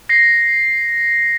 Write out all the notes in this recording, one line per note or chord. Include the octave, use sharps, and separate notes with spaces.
A#6 C7